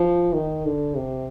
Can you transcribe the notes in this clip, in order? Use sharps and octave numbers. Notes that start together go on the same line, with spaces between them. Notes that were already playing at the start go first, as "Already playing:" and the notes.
Already playing: F3
D#3
D3
C3